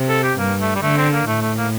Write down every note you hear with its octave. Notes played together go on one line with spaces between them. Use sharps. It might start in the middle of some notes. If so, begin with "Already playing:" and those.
Already playing: C3
A4
G4
G2 A#3
A3
G3
D3 A3
C4
A#3
A2 A3
A3
A#3